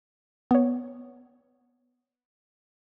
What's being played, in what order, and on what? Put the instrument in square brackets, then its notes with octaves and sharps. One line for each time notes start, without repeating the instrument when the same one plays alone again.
[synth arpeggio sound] B3 C#5